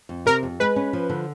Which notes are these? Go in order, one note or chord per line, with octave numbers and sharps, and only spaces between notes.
F2
C3 A#4
F2
G#3 B4
C#4
F3
D3